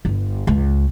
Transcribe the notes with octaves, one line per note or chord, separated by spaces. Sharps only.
G1
C#2